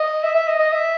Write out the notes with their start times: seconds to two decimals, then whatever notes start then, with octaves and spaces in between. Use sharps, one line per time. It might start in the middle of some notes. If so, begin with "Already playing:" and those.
Already playing: D#5
0.23 E5
0.35 E5
0.48 D#5
0.59 D#5
0.72 E5